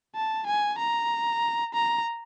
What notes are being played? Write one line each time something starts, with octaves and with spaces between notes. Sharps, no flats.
A5
G#5
A#5
A#5